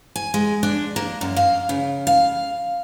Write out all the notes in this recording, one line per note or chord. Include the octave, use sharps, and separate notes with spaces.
G#5
G#3
D4
A#3
F#2
F5
C#3
F5